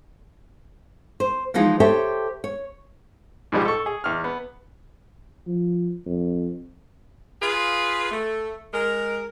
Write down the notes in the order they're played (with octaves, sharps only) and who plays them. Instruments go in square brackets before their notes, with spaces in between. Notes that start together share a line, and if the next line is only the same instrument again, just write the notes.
[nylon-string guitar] C5
E3 F3 G#3 D#4 F4 G#4
G4 A4 C5 C#5 E5 G5
C#5
[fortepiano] G#2 B2 F3 G3
A4 C#6
G#4
E2 F6
B3
[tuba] F3
F2
[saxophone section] F4 G#4 B4 F5
A3
G#3 A#4